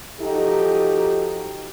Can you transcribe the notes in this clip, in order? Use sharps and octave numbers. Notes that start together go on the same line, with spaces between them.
F3 D#4 F#4 G4 A4